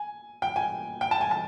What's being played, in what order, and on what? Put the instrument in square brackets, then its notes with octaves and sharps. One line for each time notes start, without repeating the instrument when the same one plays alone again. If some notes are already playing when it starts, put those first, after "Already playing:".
Already playing: [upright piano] G#5
G5
G#5
G5
A5
G#5
A5